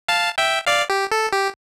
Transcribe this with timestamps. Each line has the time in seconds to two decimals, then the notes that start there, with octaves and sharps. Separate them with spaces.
0.08 F5 A5
0.38 E5 G5
0.66 D5 F5
0.90 G4
1.12 A4
1.33 G4